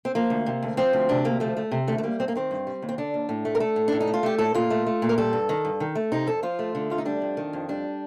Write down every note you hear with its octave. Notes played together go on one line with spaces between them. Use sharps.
C4
F3 A#3
D2
C3
D2
F3 C4
D2
C3 D4
D2 A#3
F3 A3
A3
C3
D2 A3
A3
G3 A#3
G2 C4
A#3
D#3 C4
G2
G3
D#2
C4
D3 D4
D#2
A2
A3
A#4
A3 A4
A2
A2 D4
D#4
A3
F4
A3 G4
A2 A4
A#2 F4
A3
A3
A#2
A#4
G3 A4
G2
D#3
G2
D#3
A3
C3 D#4
F2 A4
F3 F4
A3
D3
D2 F4
D#4
G3 D4
F2
D#3
F2
G3 D4